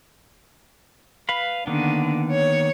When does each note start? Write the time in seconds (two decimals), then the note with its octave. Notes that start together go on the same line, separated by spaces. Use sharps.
1.29 B4 F5 B5
1.67 D3 D#3 A#3 B3
2.31 C#5